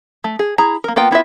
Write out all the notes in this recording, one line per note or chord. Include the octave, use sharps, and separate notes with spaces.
A3
G#4
E4 G#4 A#5
A#3 A#4
A#3 B3 F4 G5
B3 E4 F4 E5